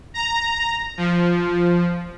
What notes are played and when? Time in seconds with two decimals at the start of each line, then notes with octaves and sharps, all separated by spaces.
0.14 A#5
0.97 F3